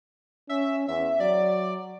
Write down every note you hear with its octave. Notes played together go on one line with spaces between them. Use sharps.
C#4 E5
E2 E5
F#3 D5